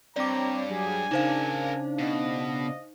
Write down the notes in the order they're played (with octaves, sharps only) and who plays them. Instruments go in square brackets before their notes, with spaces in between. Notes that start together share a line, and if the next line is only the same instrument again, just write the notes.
[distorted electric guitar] G2 [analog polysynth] C4 C#5 G5 [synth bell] D5 D6 [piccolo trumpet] A#5
[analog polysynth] F#3 G4 G#4 [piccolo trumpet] G#5
[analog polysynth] C#3 D4 [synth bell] D#4 C5 F5 [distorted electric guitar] A#4 A5
[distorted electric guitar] B2 [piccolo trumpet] D#5